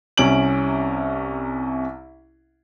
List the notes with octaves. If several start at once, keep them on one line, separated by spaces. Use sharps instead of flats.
C2 C3 C#4 D7 F#7